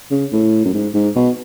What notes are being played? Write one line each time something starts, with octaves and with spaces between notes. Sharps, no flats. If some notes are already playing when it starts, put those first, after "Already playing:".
C#3
A2
F#2
G#2
G#2
B2